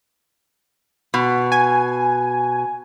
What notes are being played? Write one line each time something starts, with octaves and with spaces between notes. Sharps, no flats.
B2
G#5